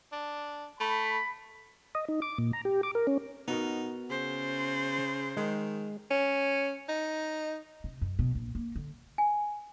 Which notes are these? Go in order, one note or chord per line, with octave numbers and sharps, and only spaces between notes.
D4
A3 B5
D#5
D#4
D6
A#2
A#5
G4
D6
A#4
C#4
B3 D#4 F#4 A#4
C#3 C5
D#3 G#3
C#4
D#4
C3
F#2
B2
A#1
A#3
D3
G#5